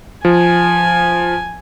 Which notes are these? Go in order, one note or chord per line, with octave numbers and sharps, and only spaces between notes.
F3 G#5